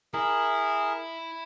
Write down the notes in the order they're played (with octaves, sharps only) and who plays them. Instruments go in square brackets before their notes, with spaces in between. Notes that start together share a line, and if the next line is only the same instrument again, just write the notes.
[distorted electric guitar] E4 [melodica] G#4 A#4